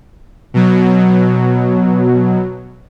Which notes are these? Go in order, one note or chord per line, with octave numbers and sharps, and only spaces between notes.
B2 F#3